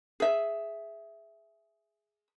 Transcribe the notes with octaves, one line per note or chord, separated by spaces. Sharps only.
G#4 E5